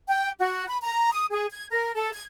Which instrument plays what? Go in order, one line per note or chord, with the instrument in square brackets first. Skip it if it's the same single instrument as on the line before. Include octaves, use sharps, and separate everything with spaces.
[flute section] G5
F#4
B5
A#5
D#6
G#4
G#6
A#4
A4
G#6